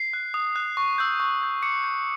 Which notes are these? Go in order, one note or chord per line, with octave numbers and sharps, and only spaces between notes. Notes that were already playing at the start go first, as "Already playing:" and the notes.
Already playing: C7
F#6
D#6
F#6
C#6
E6 G6
C#6
E6 G6
D6 C#7
G6